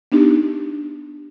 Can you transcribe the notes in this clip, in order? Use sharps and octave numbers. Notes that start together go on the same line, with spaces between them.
B3 D4 D#4 G4